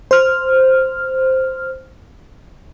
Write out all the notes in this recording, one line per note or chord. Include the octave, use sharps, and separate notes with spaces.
C5 F6